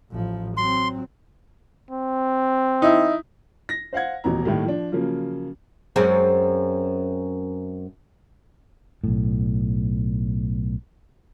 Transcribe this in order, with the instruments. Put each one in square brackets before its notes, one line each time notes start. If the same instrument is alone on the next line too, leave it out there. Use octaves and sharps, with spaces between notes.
[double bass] A1 F3
[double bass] F#3 C4 [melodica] C6
[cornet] C4
[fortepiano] D#4 E4
[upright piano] A#6
C5 F5 F#5 G#6
D#1 A1 B2 A#5
A2 D#3 G3 A#3
F3 D4
C#3 F3 F#3 A#3
[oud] F#2 G#3 C4
[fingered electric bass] B1 A2